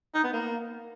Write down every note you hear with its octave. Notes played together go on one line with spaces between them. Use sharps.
D#4
B3
A#3